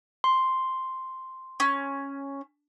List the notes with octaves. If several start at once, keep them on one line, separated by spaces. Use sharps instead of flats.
C6
C#4